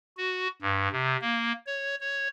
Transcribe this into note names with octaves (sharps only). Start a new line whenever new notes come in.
F#4
G2
C3
A#3
C#5
C#5